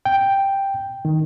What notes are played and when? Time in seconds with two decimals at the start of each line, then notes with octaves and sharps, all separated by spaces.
0.05 G5
1.05 D#3